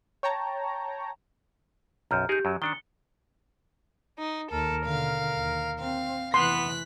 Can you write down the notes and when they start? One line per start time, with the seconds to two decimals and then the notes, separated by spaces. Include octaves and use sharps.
0.23 C#5 G5 A5 A#5
2.11 B1 F#2 A#5 F6 G6
2.29 D#4 G4 G#4 A#4 G6
2.45 F#2 F#3
2.62 D#3 D4 C#7 G7
4.18 D#4
4.52 D#2 A4 A#4
4.86 B2 D3 F5
5.36 D#2
5.80 C4 F5
6.34 F1 E3 B3 C6 F#6 B6